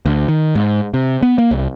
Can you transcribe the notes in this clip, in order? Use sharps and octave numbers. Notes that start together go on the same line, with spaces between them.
D2
D#3
G#2
C3
B3
A#3
C2